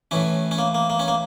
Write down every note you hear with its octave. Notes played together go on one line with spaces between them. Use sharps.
A2 E3 C#4
C#4
A#3
A#3
A#3
C#4
A#3